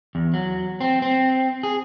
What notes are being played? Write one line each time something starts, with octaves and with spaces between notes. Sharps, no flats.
E2
F#3
C4
C4
G#4